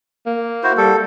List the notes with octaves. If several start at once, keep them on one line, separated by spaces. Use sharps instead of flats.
A#3
E4 F#4 C5
G3 A4